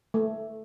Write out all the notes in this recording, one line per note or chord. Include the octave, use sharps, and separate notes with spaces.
A3